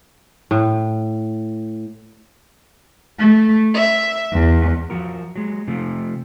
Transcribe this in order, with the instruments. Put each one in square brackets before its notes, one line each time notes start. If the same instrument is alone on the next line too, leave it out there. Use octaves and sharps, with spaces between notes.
[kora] A2
[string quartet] A3
E5
E2
[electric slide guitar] F3 F#4 A#4
F#3 G#3
C3 F3 A3